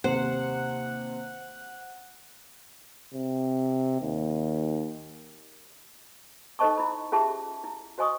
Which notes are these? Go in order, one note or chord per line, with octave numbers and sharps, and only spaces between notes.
D#2 C3 C5 F#5
C3
D#2
D#4 A4 C5 D#5 A5 C#6
E4 B5
C#4 F4 G4 G#4 E5 A5
E4
F#4 C5 D#5 G#5 C#6 D#6